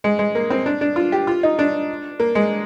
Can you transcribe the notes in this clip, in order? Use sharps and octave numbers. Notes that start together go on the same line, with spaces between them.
G#3
G#3
A#3
C4
D4
D4
F4
G4
F4
D#4
D4
A#3
G#3